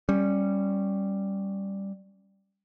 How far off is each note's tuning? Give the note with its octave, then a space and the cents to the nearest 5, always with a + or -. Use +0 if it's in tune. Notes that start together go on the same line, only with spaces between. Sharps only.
G3 +0 C#4 -10